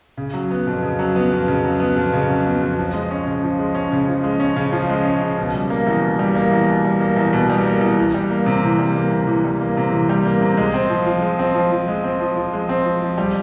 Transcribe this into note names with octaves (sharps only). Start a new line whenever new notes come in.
C#3
F#3
B3
F2
C#3
F#3
B3
F2
C#3
F#3
B3
F2
C#3
F#3
B3
F2
F3
G#3
C#4
C#3
F3
G#3
C#4
C#3
F3
G#3
C#4
C#3
F3
G#3
C#4
C#3
B2
G3
A#3
E2
B2
G3
A#3
E2
B2
G3
A#3
E2
B2
G3
A#3
E2
E3
G3
A#3
C3
E3
G3
A#3
C3
E3
G3
A#3
C3
E3
G3
A#3
C3
G#3
C4
F3
F3
G#3
C4
F3
F3
G#3
C4
F3
F3
G#3
C4
F3
F3
G3